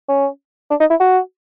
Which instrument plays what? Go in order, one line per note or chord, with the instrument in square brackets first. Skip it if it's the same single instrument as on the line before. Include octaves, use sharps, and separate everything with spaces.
[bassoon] C#4
D4
D#4
E4
F#4